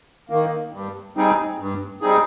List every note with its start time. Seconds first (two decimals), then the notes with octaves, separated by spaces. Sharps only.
0.30 D#3 A#3
0.73 G2
1.16 G3 C4 D#4 G#4
1.59 G2
2.01 G3 C4 D#4 G#4